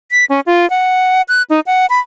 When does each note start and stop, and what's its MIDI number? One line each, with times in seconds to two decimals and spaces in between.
0.12 0.25 95
0.30 0.40 61
0.46 0.68 65
0.70 1.22 78
1.28 1.42 90
1.50 1.60 63
1.67 1.86 78
1.90 2.00 83